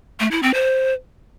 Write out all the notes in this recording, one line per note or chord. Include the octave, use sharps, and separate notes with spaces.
A3
E4
C4
C5